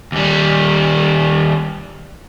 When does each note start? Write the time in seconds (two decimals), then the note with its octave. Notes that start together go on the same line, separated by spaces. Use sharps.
0.12 D#2 G3